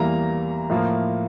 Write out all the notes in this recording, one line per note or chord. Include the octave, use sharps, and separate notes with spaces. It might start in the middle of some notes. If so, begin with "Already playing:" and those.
Already playing: E2 E3 G3 A#3 A#5
A2 F3 A#3